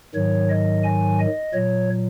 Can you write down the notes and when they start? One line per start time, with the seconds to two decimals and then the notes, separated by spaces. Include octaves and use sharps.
0.15 G#2 D#3 F#3 C#5
0.50 D#5
0.84 G#5
1.20 D#5
1.53 A#2 F#3 C#5